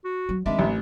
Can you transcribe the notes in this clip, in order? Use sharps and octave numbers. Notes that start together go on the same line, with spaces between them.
F#4
F#3
D#3 G3 G#3 C4 D4 E5
A1